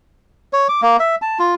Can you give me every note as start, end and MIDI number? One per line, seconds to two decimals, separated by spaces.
0.53 0.68 73
0.69 0.81 86
0.82 0.97 58
1.00 1.16 76
1.22 1.38 81
1.39 1.55 65